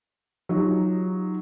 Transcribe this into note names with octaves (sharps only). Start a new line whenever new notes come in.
F#3 D#4 F4 G4